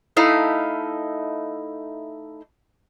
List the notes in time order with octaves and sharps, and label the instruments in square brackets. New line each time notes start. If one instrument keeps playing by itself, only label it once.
[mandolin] A3 D#4 E4 F5